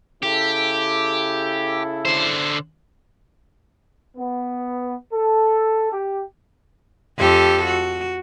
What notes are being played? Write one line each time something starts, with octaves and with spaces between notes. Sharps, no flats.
C#3 E4 G4 A4
D3 C5
B3
A4
G4
F2 G4 A4
F#4